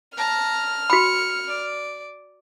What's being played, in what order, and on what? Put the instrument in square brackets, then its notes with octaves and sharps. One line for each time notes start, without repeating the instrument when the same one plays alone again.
[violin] A5 A#5 [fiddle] F6
[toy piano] F#4 B5 [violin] C#7
[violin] D5